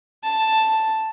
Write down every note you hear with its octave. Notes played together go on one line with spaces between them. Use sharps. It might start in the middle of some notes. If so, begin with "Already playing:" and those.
A5